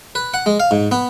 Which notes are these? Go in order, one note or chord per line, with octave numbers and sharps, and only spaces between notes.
B4
F#5
G#3
F5
G#2
B3